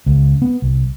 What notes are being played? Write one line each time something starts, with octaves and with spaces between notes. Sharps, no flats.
C#2
B3
C2